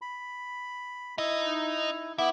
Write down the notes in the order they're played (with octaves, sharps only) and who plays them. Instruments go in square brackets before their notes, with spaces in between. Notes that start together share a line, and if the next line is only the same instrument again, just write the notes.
[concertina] B5
[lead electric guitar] D#4 D#5 [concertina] E4
[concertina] B3 D6 [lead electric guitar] E4